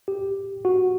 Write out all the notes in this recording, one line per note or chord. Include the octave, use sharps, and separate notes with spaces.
G4
F#4